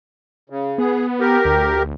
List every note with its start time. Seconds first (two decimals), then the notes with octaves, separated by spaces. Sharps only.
0.50 C#3
0.78 B3 G#4
1.20 G4 A#4
1.45 D2